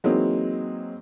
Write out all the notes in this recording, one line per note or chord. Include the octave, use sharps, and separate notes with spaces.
E3 F#3 G#3 A#3 C4 D#4